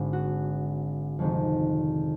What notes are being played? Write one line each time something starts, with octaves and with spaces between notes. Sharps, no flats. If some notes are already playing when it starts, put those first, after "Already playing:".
Already playing: G#1 D3
F#4
F2 C3 D#3 G#3